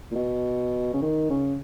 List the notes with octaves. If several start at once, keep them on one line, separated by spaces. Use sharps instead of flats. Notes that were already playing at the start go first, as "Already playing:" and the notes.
A#2
B2
C#3
D#3
C#3